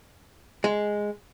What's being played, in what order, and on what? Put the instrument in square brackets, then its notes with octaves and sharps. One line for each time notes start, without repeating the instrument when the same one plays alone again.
[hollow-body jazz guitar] G#3